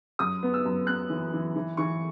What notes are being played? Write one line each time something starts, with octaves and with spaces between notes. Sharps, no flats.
F#2 D#6
B3
E6
F#2
B3 F#6
E3
E3
E3
E3 C#6